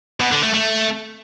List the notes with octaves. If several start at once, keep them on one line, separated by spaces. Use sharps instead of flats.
B2
D3
A3
A3